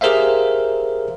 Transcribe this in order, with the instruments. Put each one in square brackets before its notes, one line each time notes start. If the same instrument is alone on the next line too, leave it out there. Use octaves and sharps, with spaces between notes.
[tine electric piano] G4 G#4 A#4 C5 E5 F5